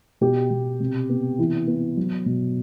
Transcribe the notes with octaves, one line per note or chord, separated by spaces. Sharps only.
B2 G4
B2
C3
B3
E3
B3
F#3
B2